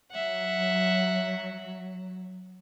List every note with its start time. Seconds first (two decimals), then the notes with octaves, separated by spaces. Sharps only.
0.12 F#3 E5 F#5